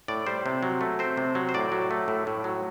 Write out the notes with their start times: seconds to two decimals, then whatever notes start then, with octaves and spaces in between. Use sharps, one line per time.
0.08 A2 D5
0.26 G3 C5
0.46 C3
0.63 F#3
0.81 A3
0.99 C4 C5
1.17 C3
1.35 F#3
1.49 C5
1.54 A2 D5
1.72 F#3
1.91 A3
2.08 A2
2.27 A2
2.44 F#3